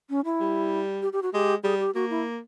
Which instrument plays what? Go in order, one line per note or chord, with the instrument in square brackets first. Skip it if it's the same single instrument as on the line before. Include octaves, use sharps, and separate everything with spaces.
[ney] C#4
E4
[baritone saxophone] G3
[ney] G4
G4
F#4
[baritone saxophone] G#3 [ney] G4
[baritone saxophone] G3 [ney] G#4
[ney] G4
[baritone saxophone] A#3 [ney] F#4
[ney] E4